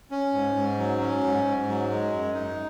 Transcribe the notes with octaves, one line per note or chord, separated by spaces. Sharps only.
C#4
G#2
G#2
F#3
C#4
G#2
G#2
F#3
G#3
F#2
D#4